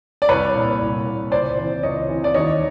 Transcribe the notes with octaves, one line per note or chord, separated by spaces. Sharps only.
D5
C2 B4 C#5
A#2
C2
A#2
C#2 C5 D5
C3 E3
C#2 C#5 D#5
C3 E3
D5
D#2 C#5 D#5